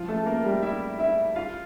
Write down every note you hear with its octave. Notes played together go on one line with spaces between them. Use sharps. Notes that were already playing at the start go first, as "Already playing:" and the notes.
Already playing: F3 F4
A3 A4
A#3 A#4
G3 G4
E4 E5
E4 E5
F4 F5